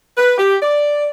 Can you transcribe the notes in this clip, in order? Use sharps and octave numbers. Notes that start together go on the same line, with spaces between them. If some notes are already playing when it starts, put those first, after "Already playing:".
B4
G4
D5